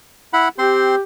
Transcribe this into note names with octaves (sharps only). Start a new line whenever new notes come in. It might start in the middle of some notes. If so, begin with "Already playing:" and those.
E4 F#5 B5
C4 G4 C5 C6